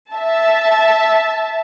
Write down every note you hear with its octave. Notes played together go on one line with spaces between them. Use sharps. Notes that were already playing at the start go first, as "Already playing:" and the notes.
E5 A5